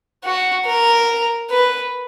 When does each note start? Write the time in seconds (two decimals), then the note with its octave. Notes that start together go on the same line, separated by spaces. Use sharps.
0.25 F#4
0.66 A#4
1.50 B4